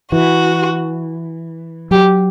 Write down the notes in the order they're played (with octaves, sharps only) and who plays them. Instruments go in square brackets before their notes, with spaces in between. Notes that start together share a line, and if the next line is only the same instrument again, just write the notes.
[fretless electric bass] E3 [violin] F#4
[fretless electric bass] F#3 [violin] G4